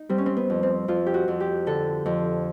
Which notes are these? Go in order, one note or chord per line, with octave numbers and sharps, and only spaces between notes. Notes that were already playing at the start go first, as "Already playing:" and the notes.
Already playing: D#4
G3 C4
C#4
C4
B3
F2
C4
F2 F4
G4
F#4
F2
G4
D3 A4
F2